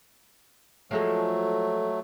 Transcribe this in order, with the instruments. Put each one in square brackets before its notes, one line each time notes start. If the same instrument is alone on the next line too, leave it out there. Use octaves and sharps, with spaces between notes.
[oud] F3 G#3 A4 [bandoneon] F#3 A3